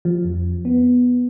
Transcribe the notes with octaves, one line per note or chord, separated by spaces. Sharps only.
F3
F2
B3